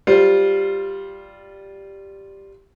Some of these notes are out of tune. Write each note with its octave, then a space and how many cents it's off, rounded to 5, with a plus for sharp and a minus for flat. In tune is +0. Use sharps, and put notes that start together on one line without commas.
G3 +0 F4 +0 C5 +5